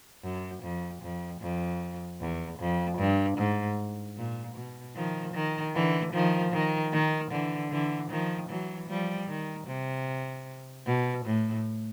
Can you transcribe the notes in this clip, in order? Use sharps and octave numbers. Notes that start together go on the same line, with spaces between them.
F#2
F2
F2
F2
E2
F2
G2
G#2
A#2
B2
D#3 F3
D#3
D3 E3
D#3 F3
D#3
D#3
D3 E3
D3 E3
D#3 F3
E3 F#3
F3 G3
D#3
C3
B2
A2